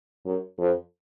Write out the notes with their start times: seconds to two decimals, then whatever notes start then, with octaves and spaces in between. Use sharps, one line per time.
0.25 F#2
0.59 F2